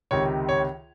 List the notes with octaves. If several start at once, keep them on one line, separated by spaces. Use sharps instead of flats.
C#2 C3 D#3 C#5
C#5